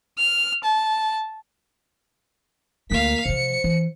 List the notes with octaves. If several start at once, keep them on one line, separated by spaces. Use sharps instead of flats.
F6
A5
D2 A3 A#3 F5 B6
C3 F3 C5 C#7
E3